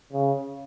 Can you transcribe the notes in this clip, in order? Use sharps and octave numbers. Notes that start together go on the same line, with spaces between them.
C#3